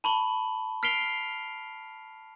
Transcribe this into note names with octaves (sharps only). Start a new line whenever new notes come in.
A5 B5 C#6 F#7
F6 B6 C7 D7 F7 G7